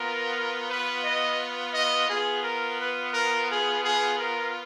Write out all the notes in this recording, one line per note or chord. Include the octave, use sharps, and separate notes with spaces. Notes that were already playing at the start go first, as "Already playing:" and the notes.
Already playing: B3 F4 A#4
B4
D#5
D#5
B3 F4 G#4
A#4
B4
A#4
G#4
G#4
A#4